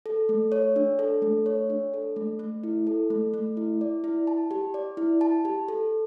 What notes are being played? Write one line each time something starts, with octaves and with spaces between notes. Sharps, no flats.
A4
A3
C#5
D4
A4
A3
C#5
D4
A4
A3
A3
E4
A4
A3
A3
E4
D5
E4
A5
G4
D5
E4
A5
G4
A4